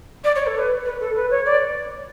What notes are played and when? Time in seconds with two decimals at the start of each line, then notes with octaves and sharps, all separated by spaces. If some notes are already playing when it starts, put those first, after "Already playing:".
0.24 D5
0.35 C#5
0.46 A4
0.57 B4
0.85 B4
1.00 A4
1.15 B4
1.30 C#5
1.45 D5